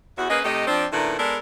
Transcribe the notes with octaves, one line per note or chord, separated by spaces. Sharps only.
E2 F#4
A#3 C#4 G#4 B4 D#5
C3 A3 D#4 G4 D#5
F3 C4 D4
A#2 D#3 A3 B3 D4 E4
G#3 B3 D4 A4 A#4